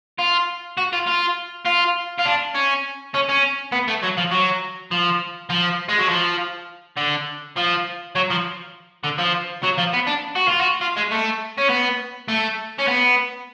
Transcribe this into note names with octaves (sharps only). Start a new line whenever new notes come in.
F4
F#4
F4
F4
F4
F4
D4
C#4
C#4
C#4
B3
A3
F#3
F3
F#3
F3
F3
G#3
F#3
F3
D3
F3
F#3
F3
D3
F3
F#3
F3
B3
D4
F#4
F4
F#4
F4
G#3
A3
C#4
B3
A3
C#4
B3